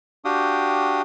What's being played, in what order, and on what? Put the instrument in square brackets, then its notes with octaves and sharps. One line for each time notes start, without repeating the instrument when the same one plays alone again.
[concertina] D4 F#4 G4 F5 G5 D#6